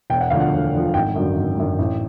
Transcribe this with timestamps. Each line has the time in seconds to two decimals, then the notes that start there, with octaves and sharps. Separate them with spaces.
0.10 E1 G5
0.21 F#5
0.30 D2 D3 F3 F5
0.40 F#5
0.52 E1
0.73 D2 D3 F3
0.94 G#1 G5
1.15 F#2 D3 F#3
1.36 G#1
1.57 F#2 D3 F#3
1.79 A1